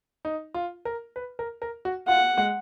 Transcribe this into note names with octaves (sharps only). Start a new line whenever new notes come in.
D#4
F4
A#4
B4
A#4
A#4
F#4
F4 F#5
G#3